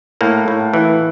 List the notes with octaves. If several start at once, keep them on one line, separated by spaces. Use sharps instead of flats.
A2 A#3
A2
E3